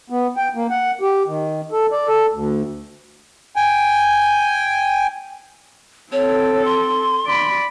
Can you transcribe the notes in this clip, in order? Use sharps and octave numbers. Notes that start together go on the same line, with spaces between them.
B3
G5
A#3
F#5
G4
D#3
A4
D5
A4
D2
G5 G#5
C4 A4 C#5
C6
D5 B5